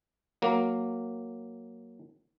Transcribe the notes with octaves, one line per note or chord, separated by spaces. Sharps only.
F#3 A#3